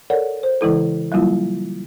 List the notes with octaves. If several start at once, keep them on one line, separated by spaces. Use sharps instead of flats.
A4 A#4 C#5 D5 F#5
C5
C#3 E3 G#3 E4 A4
F#3 G3 A#3 E4 F4